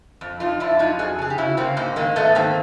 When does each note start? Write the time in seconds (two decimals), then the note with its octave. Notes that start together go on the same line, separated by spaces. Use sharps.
0.21 F2
0.40 F2 D#4 F4
0.60 F2 D4 E4
0.79 F#3 D#4 F4
0.99 F2 F#4 G#4
1.19 C#3 G#4
1.30 G4
1.38 C#3 E4 F#4
1.57 C#3 A#3 C4
1.77 G#2 A#3 C4
1.96 D#3 G#3 A#3
2.16 G#2 A3 B3
2.35 D#3 A#3 C4